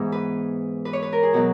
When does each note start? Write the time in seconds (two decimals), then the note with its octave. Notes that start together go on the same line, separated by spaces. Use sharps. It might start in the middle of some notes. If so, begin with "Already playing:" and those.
Already playing: G#2 E3 B3 E4 G#4
0.12 B4
0.85 B4
0.93 C#5
1.03 B4
1.13 A#4
1.23 G#4
1.33 B2 F#3 F#4